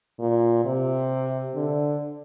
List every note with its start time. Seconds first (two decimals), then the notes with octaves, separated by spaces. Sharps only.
0.20 A#2
0.65 C3
1.55 D3